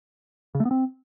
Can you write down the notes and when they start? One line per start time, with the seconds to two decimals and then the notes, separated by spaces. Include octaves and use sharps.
0.55 C#3
0.60 A3
0.65 B3
0.71 C4